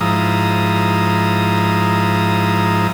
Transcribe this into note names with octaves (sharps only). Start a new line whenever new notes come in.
G#2 F3 E4 A#5 D#6